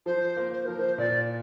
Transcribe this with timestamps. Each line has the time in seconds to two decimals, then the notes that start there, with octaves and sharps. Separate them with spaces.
0.06 F3 C5
0.37 A#3
0.52 C5
0.65 F3 A#4
0.78 C5
0.98 A#2 D5